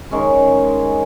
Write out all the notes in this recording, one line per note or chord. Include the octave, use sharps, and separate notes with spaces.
D#3 G#3 C#4